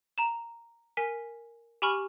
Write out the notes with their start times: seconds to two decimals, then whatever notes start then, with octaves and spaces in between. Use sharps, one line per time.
0.18 A#5 E7
0.97 A#4 G#5 B6
1.82 G4 G#5 B5 C#6 F6